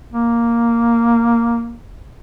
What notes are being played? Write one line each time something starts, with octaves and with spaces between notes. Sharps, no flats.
A#3